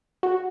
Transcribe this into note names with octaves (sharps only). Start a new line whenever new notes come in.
F#4